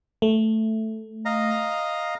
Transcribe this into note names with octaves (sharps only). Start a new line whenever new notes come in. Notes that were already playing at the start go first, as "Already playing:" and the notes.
A3
D#5 F5 A#5